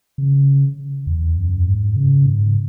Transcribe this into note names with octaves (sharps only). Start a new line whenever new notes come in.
C#3
E2
F#2
G#2
C#3
G#2